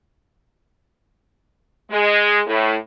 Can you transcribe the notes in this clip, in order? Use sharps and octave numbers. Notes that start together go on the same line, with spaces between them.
G#3
A2